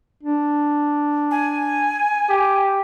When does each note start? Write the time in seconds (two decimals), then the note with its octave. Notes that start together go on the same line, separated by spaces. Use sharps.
0.23 D4
1.31 G#5
2.30 G4